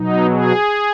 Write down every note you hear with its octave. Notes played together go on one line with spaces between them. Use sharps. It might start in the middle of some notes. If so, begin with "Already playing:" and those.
Already playing: B2 F#3 D#4
G#4